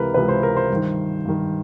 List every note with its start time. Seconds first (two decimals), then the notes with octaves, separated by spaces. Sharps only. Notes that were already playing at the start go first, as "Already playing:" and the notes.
Already playing: C#2 C3 E3 A#4 B4
0.14 C#2 C3 E3 B4
0.29 C5
0.43 A#4
0.57 C5
0.70 G2 D#3
1.25 G2 D#3